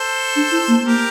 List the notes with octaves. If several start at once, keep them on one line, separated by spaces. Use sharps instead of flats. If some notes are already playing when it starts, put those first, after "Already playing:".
Already playing: A4 C5
D4
E4
A#3
A#3 G4 A#4